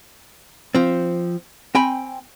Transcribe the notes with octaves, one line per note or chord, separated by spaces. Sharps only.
F3 C4
C4 G5 G#5 B5